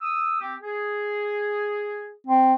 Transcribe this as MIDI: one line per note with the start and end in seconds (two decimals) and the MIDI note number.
0.02 0.40 87
0.02 0.40 88
0.41 0.55 60
0.41 0.55 67
0.63 2.13 68
2.27 2.54 60